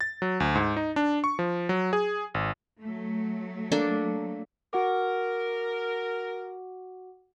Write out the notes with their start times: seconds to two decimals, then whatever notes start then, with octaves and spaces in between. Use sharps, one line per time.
0.01 A6
0.22 F#3
0.40 D2
0.55 G#2
0.77 D#4
0.96 D4
1.24 C#6
1.39 F3
1.69 F#3
1.93 G#4
2.34 G#1
2.82 F#3 A3
3.72 A#3 D4 A4
4.73 F#4 A#4 F#5 D6